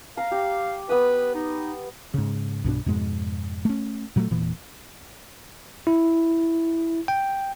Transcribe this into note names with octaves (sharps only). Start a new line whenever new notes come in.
F5 A#5
G4
B3 B4 D#6
D#4
G#2 C#3
B1 G2 B2 D4
F2 G#2 B2 G#3
A3 C#4
A#2 F#3 G3 A3
E1 A#2 E3
E4
G5